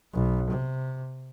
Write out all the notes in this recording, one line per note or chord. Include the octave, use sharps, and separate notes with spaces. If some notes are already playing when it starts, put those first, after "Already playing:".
B1
C3